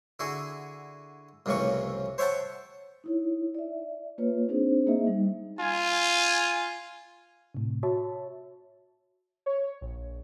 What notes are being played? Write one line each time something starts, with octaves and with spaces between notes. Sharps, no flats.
D3 E4 F#4 G#4
C2 F2 A2 C#3 E3 C#6
C5 C#5 E5 F#5 G5 A5
D#4 E4 C#5
D5 E5
A#3 F4 B4 C#5
C4 D4 D#4 G#4 C5
A#3 D#4 G#4 D#5 E5
G3 D#4
F4 G#5
A2 C3
F#4 C#5 E5 A5
C#5
A#1